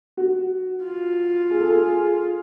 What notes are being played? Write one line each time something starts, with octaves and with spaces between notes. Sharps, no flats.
F#4
F4
G#4
A4
G#4